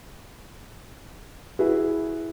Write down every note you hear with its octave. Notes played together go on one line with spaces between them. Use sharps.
E4 F#4 G#4 B4